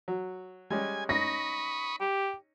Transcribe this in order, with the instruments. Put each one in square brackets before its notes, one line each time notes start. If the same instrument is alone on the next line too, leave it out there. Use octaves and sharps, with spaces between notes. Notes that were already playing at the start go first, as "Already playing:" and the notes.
[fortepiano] F#3
[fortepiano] G3 G#3 C#4 [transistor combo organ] G#5
[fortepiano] C#4 D#4 [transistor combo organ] B5 C#6 D#6 [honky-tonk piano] A#6
[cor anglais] G4